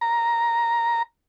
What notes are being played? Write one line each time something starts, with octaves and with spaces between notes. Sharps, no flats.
A#5